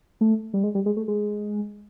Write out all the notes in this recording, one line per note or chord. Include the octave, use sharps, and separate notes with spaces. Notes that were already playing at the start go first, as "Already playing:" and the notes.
A3
G3
G#3
G3
G#3
A3
G#3